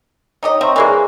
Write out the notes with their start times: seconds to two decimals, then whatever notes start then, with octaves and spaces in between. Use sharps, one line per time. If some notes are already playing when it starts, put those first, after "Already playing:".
0.43 D#4 G4 C#5 D#5
0.61 C4 E5 A#5 C6 C#6
0.76 E3 G#3 A#3 G#4 A#4 D5